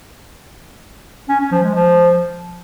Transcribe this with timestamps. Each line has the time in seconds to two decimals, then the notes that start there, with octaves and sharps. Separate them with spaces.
1.29 C#4
1.40 C#4
1.52 F3
1.63 G#3
1.75 F3